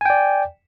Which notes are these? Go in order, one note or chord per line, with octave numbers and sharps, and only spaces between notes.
D5 G5 G#5